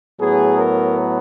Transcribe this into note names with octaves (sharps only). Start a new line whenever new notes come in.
A2 F#3 B3 G#4
A#4